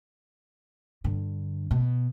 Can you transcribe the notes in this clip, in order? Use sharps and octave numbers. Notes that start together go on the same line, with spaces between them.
G2 D3
B2